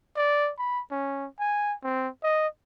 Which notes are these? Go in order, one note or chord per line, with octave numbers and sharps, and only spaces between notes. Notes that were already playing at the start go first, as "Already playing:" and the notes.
D5
B5
C#4
G#5
C4
D#5